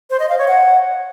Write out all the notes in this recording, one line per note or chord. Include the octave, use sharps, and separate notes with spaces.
C5
D#5
F5
C#5
F#5